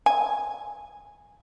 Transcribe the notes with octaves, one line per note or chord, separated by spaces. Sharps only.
G#5